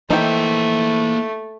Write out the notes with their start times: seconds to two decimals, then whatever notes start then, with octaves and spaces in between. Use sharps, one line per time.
0.10 E3 A3 A#3 D#4 C5 G5